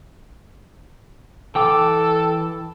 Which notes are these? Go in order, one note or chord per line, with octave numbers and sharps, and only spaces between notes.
E3 A4 G5 D6